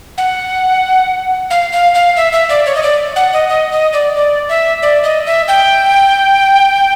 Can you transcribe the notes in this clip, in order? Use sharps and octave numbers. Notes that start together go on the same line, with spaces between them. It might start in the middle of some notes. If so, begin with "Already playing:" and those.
F#5
F5
F5
F5
E5
E5
D5
C#5
D#5
D5
F#5
D#5
D#5
D#5
D5
D5
E5
D5
D#5
E5
G5